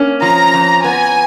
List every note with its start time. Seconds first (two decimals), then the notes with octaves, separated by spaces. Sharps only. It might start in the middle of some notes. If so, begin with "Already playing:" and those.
Already playing: A#3 C#4
0.22 F3 A#5
0.54 F2
0.84 B3 G#5